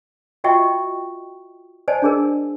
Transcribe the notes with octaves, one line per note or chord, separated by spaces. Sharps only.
F4 F#4 D#5 E5 G5 C#6
C5 D5 D#5 G#5 A5
D4 G#4 A#4